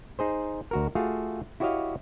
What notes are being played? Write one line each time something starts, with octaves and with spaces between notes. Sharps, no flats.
D#4 G#4 C5
D2 F#4 A#4
A3 F4 F#4 G#4 F5
E4 F#4 G4 C#5 D#5 F5